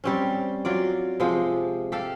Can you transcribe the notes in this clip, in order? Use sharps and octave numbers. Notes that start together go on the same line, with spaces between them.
G3 C4 C#4
F#3 F4 D5
C3 F3 G#3 F4
G4 A4 F5